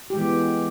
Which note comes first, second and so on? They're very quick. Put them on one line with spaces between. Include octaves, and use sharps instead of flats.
G4 G#3 E3 B3